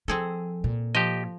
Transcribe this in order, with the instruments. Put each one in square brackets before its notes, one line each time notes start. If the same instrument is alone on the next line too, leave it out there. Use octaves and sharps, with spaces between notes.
[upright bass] F3 [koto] C4 G#4 A4
[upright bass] A#2
[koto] F3 [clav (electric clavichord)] G4 D#5